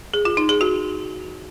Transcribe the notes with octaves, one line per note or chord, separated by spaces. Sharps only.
G#4
F4
D#4
G#4
F#4